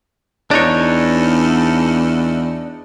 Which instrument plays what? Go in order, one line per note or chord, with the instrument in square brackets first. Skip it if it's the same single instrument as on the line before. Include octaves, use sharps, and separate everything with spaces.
[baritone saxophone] E2 [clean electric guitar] D4 D#4 C#5